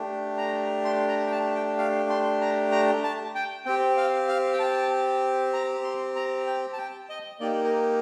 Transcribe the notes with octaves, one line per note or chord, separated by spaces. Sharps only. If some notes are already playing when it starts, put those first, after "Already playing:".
Already playing: A3 D4 G4
A#5
C6
A#5
G5
A5
G5
F5
C6
A#5
A#5
A5
G5
C4 G4 G5
F5
F5
G5
A5
A#5
C6
A#5
G5
A5
G5
D#5
A#3 D#4 G4 D5
A#4